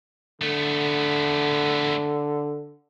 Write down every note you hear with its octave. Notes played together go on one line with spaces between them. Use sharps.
D3 A3 B3